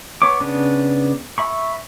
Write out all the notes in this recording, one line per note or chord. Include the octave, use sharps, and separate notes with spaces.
B3 C#5 C#6 D6
C#3 B3 D4
E5 B5 C#6